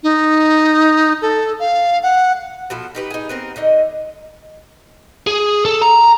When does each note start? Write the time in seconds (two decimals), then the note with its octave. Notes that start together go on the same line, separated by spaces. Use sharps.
0.03 D#4
1.22 A4
1.60 F5
2.03 F#5
2.70 B2 F3 A4
2.95 D#4 G4 B4
3.11 D#4 G#4
3.29 B3 C4 A#4
3.56 D3 D#4 D#5
5.27 G#4
5.65 A4
5.82 A#5